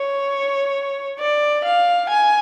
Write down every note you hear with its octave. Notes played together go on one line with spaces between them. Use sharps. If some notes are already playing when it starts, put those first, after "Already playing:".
Already playing: C#5
D5
F5
G#5